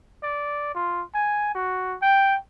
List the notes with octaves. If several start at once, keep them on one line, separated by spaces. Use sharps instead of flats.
D5
F4
G#5
F#4
G5